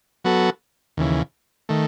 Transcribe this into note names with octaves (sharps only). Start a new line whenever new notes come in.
F#3 B3 F#4 A4
D#2 C#3 E3
D#3 A3